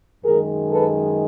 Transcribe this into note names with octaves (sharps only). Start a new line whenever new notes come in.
F#2 D#3 G#3 G#4 A#4
A4 B4